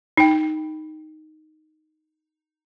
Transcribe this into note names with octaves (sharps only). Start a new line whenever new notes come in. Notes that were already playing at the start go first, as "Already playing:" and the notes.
D#4 G5